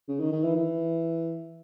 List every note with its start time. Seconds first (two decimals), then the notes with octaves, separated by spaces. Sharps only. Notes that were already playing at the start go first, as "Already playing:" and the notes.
0.08 C#3
0.20 D#3
0.32 D#3
0.44 E3
0.55 E3